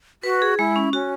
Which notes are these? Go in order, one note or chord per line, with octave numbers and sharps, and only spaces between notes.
F#4 B4
G#4
G#3 E4
C#4
C#4 F#4